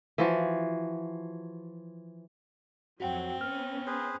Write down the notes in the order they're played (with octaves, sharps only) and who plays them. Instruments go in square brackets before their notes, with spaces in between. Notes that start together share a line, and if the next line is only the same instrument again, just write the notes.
[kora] E3 F3 F#4
[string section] F2 F#3 [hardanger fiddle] C4 [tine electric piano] F#4 F#5 G5
[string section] B3 C#4 [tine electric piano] F6
[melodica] G#4 B4 C5